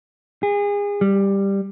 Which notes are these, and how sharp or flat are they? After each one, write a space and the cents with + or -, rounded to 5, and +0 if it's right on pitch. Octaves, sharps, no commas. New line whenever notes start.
G#4 -30
G3 +10